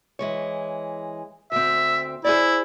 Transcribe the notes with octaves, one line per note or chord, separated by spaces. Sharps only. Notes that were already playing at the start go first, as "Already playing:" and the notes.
E3 G#3 C#5
D2 C4 E5
E4 G#4 C5 D5